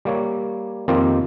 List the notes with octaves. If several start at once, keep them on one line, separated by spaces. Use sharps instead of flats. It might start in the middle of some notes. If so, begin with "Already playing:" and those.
G3 A#3 C#5
F2 D#3 A#3 C4 F4 G4